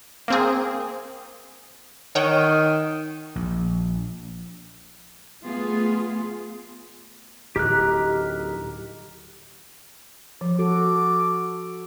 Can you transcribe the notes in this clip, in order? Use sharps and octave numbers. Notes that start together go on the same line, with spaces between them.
A#3 C4 G#4
D#3 C#5 F#5 G5
A#1
A3 B3 F4 G#4
D1 D#4 G4 A#4 F#6
F3
F#4 A4 D6